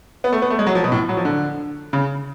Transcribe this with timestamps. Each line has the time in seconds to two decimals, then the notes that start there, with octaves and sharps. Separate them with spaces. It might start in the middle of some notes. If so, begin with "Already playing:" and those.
0.24 B3
0.32 A3
0.42 B3
0.50 A3
0.59 G#3
0.67 F#3
0.75 F3
0.84 B2
0.92 A2
1.09 F#3
1.17 F3
1.25 D3
1.93 C#3